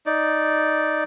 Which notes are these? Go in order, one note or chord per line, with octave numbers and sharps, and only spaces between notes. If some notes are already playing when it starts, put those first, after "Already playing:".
D#4 D5